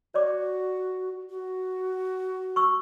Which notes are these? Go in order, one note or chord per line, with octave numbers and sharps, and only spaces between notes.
F#4 C#5 D5 D6
F#4
C#6 E6